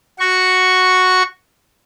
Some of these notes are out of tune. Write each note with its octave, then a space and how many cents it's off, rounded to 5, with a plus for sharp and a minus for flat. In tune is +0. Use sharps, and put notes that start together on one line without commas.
F#4 +0 C#6 +0